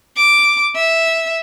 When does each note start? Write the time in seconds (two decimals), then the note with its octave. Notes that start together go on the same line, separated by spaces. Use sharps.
0.17 D6
0.76 E5